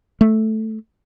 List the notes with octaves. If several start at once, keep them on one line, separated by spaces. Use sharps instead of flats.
A3